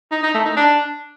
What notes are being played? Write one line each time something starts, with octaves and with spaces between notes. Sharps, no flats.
D#4
D#4
A3
D#4
D4